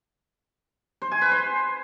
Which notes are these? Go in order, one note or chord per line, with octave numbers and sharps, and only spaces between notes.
C5
G#5
B4
C5